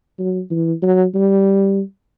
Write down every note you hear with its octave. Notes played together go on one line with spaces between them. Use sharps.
F#3
E3
F#3
G3